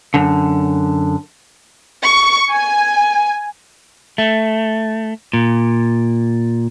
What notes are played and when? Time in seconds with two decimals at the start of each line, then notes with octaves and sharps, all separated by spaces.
0.14 F#2 D3
2.04 C#6
2.51 G#5
4.18 A3
5.33 A#2